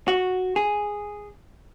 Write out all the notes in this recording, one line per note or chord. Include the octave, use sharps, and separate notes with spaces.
F#4
G#4